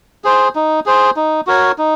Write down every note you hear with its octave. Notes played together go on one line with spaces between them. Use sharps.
G#4 C5
D#4
G#4 C5
D#4
F#4 A#4 C#5
D#4